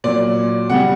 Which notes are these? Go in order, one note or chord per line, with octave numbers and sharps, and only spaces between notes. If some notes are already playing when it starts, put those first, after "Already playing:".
A#2 F#3 D5
C#3 G3 F#5